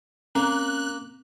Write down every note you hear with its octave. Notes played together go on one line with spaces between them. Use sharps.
A#3 C4 C#4 F#6